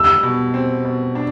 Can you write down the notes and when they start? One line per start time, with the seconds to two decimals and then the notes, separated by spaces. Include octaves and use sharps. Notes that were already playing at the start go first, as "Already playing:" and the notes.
Already playing: G3 E6
0.23 B2
0.54 C4
0.85 B2
1.15 D4